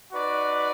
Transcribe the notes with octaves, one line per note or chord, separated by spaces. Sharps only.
D#4 F#4 B4 D5